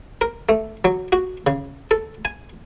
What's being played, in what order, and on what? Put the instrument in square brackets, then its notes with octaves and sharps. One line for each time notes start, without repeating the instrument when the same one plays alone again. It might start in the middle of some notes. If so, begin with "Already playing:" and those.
[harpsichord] A#4
A3
F#3
F#4
C#3
A4
G#5